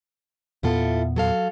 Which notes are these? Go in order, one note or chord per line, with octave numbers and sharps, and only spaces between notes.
E2 A#2 B3 E4 F4 A4
F#3 A4 F5